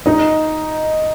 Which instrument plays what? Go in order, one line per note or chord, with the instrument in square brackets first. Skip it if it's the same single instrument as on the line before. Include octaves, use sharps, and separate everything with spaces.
[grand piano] D#4 D#5